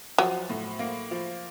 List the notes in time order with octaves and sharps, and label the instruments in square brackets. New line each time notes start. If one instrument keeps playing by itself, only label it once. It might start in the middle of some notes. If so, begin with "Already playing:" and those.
[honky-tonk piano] F3 [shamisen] F#3
[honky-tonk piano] A2
A#3
F3